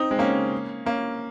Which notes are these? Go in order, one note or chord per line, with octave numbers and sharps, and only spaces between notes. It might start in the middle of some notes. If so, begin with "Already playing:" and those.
Already playing: C4 D#4
G#3 C4
A#3 C#4
A#3 C#4